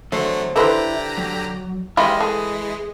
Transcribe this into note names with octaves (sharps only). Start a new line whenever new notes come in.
E2 D3 F#3 A3 C5
D3 E4 G4 A4 B4 C5 E5 A#5
F#3
E3 G3 G#3 E4 F4 A#4 D#5
A3 G#4